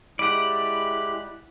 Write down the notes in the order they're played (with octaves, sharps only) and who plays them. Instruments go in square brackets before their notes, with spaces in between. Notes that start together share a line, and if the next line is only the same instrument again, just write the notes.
[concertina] G#3 G4 B5 [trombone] E4 [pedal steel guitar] D5 F#5